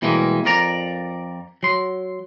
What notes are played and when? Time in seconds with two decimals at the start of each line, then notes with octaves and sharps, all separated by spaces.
0.02 B2 E3 G3 G#3 A#3
0.45 F2 A#4 D5 A#5
1.63 F#3 C6